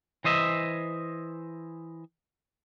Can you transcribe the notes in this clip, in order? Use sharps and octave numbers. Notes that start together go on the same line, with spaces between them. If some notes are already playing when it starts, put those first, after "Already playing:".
E3 C5 D#5 E5